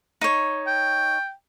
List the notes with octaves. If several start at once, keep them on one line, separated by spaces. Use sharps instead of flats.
D#4 C#5
G5